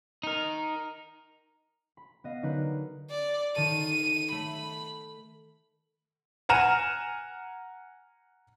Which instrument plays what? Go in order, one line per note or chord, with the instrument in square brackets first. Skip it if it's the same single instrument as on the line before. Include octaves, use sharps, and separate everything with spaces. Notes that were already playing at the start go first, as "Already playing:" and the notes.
[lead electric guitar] D#4 A#4
[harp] B5
B3 D#5 F5
D3 F#3 D#4 G4 A#4 B4
[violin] D5
[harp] D#3 A4 [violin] D#7
[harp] A3 [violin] B5
[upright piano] F#5 G#5 A#5 F6 D#7 E7